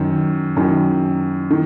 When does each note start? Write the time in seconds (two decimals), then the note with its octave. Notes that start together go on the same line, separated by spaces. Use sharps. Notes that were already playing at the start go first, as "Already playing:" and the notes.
Already playing: F#2 D#3
0.56 F#2 D#3
1.51 D#3